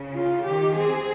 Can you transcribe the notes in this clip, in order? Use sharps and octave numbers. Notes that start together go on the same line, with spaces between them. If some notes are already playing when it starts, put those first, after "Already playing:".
Already playing: C#3
F4
D#3 G4
C4 G#4